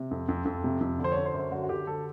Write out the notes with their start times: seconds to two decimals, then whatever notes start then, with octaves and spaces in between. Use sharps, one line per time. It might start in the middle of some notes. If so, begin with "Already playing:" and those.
Already playing: C3
0.11 F2
0.29 F2
0.45 F2
0.64 C3
0.81 F2
0.99 D3
1.04 C5
1.12 D3 C#5
1.26 C5
1.34 F#2
1.39 C5
1.52 D3 F#4
1.63 F#4
1.69 D3 G4
1.87 D3 A4